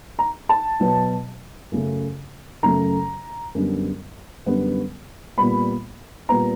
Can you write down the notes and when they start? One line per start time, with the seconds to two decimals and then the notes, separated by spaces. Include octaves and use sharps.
0.19 A#5
0.49 A5
0.80 B2 F#3 B3
1.72 F#2 C#3 F#3 A3
2.63 F#2 C#3 F#3 A3 A#5
3.55 F#2 D3 G3 B3
4.46 F#2 D3 G3 B3
5.38 A#2 G3 B3 B5
6.29 A#2 G3 B3 A#5